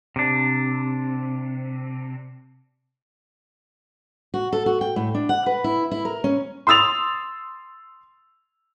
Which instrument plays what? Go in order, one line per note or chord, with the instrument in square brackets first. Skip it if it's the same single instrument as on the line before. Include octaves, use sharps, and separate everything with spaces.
[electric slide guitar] C3 D4
[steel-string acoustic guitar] F#4
A4
F#4
G5
A2
D4
F#5
B4
E4
E4
A#4
C#4
[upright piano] C6 D#6 E6 A6 F7